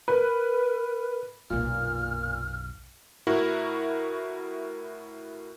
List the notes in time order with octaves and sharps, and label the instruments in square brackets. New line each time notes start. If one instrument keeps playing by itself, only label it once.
[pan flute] A#4 [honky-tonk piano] B4
[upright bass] B1 F#2 [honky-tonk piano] A#2 [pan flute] F6
[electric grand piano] A2 E4 F#4 A#4